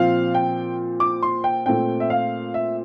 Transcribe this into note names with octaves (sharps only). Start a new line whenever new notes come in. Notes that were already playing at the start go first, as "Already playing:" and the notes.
Already playing: A#2 F3 C4 F5
G5
D6
C6
G5
A#2 A3 C4 G5
E5
F5
E5